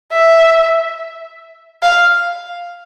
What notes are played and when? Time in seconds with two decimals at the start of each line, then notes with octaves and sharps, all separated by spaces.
0.13 E5
1.83 F5